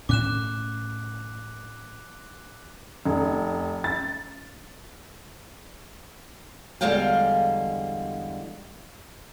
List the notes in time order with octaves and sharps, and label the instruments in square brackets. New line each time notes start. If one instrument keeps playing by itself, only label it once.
[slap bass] A2 C#4 [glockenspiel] D6 F#6 E7
[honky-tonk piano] F1
A6
[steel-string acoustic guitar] E2 D3 G3 G#3 F5 G5